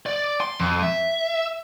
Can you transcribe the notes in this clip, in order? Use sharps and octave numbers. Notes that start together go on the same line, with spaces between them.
D5
C6
F2
E5